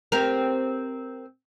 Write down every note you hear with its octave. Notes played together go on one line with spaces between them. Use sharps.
C4 G4 A#4